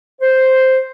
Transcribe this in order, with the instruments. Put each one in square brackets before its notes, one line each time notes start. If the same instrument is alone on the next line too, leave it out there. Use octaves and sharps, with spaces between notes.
[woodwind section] C5